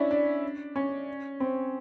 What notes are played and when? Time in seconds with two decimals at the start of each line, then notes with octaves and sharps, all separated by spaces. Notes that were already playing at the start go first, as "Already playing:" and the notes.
Already playing: C#4 D4 E4
0.11 D4
0.76 C#4
1.40 C4